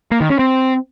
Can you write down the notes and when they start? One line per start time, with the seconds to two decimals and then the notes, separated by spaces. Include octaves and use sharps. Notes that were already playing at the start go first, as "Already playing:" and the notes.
0.11 A#3
0.21 D#3
0.30 C#4
0.39 C4